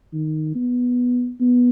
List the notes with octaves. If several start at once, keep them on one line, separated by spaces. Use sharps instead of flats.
D#3
B3
B3